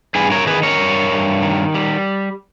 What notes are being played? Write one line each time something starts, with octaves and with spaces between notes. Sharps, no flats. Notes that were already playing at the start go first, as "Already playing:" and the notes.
G2 G#4 B4
A#4 C#5
D#3 G#4 B4
A#4 C#5
G2
G2
D#3
G3